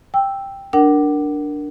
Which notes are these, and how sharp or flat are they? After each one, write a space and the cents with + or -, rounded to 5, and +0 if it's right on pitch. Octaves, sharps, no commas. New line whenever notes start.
G5 +5 E6 +0
D4 +0 A#4 +0 F#5 +35